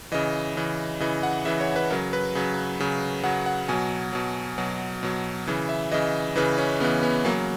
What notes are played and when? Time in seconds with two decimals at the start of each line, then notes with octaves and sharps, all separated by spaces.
0.12 C#3 E3 D#5
0.57 C#3 E3
1.00 C#3 E3 D#5
1.23 F#5
1.45 C#3 E3 E5
1.60 C#5
1.76 B4
1.90 C#3 F#3 A#4
2.13 B4
2.35 C#3 F#3
2.80 C#3 F#3
3.23 C#3 F#3 F#5
3.46 F#5
3.68 B2 F#3 G#5
4.13 B2 F#3
4.58 B2 F#3
5.03 B2 F#3
5.47 C#3 E3
5.69 E5
5.91 C#3 E3 D#5
6.36 C#3 E3 B4
6.58 C#4
6.80 C#3 B3
6.84 E3
7.03 B3
7.25 C#3 F#3 A#3